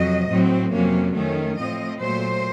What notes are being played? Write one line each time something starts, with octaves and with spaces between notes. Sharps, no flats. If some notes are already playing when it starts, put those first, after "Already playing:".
Already playing: F2 C3 F#3 D#5
A2 F#3 C4
F2 C3 F#3 A#3 C#4
F2 D#3 A3 C#4
A2 F3 C4 D#5
A#2 F#3 A3 C5